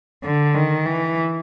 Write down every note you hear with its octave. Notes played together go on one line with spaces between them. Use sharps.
D3
D#3
E3